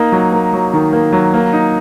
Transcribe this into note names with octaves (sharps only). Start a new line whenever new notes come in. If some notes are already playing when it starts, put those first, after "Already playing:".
Already playing: A#3 D#4
F#3
A#3
F#3
D#3
A#3
F#3
A#3
D#4